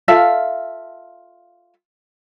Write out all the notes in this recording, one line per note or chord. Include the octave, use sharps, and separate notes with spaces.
F4 A4 E5 F5